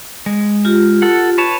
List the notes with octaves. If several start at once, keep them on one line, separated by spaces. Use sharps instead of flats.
G#3
F4 G4
A4 F#5
B4 C#5 A5